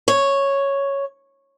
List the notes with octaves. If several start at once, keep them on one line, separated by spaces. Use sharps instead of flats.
C#5